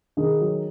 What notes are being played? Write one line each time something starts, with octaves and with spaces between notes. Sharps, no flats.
D#3 G#4
F#3